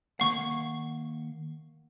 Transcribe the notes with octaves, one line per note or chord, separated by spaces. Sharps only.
D#3 A#3 F#5 C#6 C7